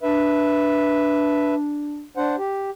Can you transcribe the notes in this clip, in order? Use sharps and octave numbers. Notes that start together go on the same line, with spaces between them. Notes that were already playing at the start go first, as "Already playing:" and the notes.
D4 B4 E5
D4 C5 F#5
G4